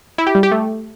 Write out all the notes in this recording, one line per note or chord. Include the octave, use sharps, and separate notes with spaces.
E4
G4
G3
G4
A3